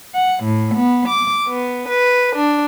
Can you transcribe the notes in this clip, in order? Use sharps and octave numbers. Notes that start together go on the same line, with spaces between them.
F#5
A2
B3
D6
B3
B4
D4